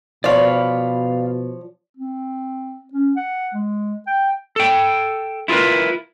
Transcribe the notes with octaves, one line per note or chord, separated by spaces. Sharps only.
B2 F3 C#5 D5 F5 B5
C4
C#4
F#5
G#3
G5
A4 G5
E4 F4 G#4 A#4 B4